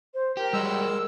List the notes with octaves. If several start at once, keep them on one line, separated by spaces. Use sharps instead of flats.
C5
G4 A#4
G3 G#3 F#4 E6